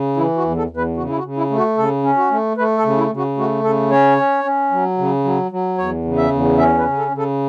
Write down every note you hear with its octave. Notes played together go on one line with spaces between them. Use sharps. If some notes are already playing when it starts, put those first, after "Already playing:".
Already playing: C#3
E3 E4
F#4
E2
A4
E2
B4
C#3 F#4
E4
F#4
C#3
E4
A3
F#4
C#3 A4
C#4
F#4
A3
A3 B4
A4
C#3
E4
C#3
F#4
A3 F#4
C#3 A4
C#4 C#5
C#4
C#4
F#3
C#3
F#3
F#3
E2 C#5
C#3
E5
E2
C#4 E5
B4
C#3
A4
C#3
A4